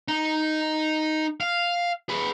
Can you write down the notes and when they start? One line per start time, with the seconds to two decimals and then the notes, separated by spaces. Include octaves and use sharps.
0.08 D#4
1.41 F5
2.09 G#4 B4